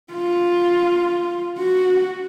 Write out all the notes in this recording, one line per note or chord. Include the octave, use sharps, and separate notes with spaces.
F4
F#4